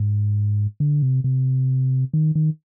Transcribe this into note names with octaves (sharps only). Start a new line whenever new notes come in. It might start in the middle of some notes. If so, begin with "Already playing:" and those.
Already playing: G#2
D3
C3
C3
D#3
D#3